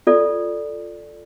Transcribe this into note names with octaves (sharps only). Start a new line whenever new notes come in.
F4 A4 D5